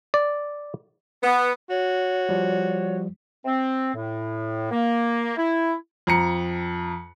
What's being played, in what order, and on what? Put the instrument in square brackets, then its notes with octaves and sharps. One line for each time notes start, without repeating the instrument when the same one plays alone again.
[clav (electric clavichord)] D5
[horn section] B3
[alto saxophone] F#4 [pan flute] C#5
[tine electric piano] F3 G3
[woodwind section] C4
A2
A#3
E4
[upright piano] F2 A#5 C#7